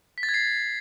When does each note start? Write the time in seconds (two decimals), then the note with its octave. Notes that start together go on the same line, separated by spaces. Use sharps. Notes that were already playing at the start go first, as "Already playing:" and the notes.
0.18 B6
0.23 A6
0.29 G#6
0.34 C7